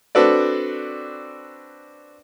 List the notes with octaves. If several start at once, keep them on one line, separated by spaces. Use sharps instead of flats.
C4 D4 F#4 A4 B4 D5